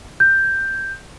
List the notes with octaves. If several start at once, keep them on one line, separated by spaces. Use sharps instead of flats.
G6